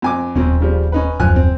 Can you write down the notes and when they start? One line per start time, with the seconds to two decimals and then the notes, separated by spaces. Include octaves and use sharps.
0.02 F2 G#5 D6
0.35 D#1 F2 C4 C#4
0.60 C#3 F3 G3
0.92 C#4 D#4 B4
1.20 D#1 F#2 F3 G#5 F#6
1.36 C4